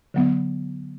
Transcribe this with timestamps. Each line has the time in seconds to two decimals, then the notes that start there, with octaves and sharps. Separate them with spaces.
0.14 D3 F#3 B3